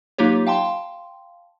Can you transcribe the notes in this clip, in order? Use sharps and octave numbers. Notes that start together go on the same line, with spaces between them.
F#3 A#3 D#4 F4 G4 C#5
F5 G5 A5 C6